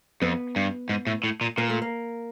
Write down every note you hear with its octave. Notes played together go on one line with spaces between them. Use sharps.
F2 B3
G2
G#2
A2
A2
A#2
A#2 A#3
A3
A#3